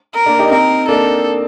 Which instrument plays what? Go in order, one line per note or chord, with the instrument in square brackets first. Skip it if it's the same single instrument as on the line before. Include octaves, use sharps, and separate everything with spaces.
[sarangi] A#4
[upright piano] A#3 D4
D#4 G4
[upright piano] C4 D#4 [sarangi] A#4
[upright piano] A#3 D4 [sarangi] A4